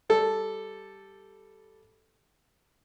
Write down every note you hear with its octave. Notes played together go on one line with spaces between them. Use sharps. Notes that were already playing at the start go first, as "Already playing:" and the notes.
G3 A4